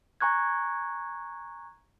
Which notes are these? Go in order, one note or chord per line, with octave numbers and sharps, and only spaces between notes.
G#5 A#5 C#6 F#6 G#6